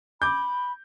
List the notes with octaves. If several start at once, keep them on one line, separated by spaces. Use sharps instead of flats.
B5 D6 G6